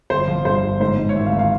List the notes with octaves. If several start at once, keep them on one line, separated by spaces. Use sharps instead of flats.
G1 C5
F3
G2 C5
G1
G#2 C5
G#2
C#5
G#1 E5
F5
G#1
F5